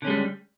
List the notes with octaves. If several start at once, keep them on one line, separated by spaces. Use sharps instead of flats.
D3 G3 G#3 C#4